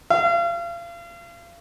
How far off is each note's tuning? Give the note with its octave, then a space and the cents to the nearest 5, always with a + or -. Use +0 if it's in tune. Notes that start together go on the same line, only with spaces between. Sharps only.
F5 -35